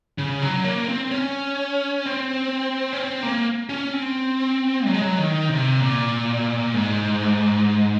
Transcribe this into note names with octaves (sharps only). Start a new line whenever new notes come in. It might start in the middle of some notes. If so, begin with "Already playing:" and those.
C#3
F#3
A#3
C4
C#4
C4
C#4
C4
A#3
C#4
C4
F#3
G#3
F#3
D#3
C3
A#2
G#2